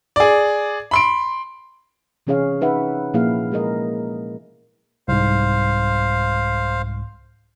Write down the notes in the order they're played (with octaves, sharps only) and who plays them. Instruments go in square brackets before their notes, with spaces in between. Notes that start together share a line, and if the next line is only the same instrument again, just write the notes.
[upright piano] G#4 D5
B5 C6 D7
[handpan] C3 E3 C#4 G#4 C#5 F5
D#4 B4 E5 F#5
A#2 F3 A#3 E4 G#4 F5
G#3 G#4 A#4 D#5
[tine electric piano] C2 G#2 [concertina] C5 F5